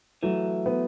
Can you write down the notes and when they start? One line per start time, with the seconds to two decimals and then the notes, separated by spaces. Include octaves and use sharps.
0.23 E3 F#3 A3
0.66 B3